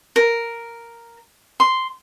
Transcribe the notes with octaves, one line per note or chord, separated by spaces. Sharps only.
A#4
C6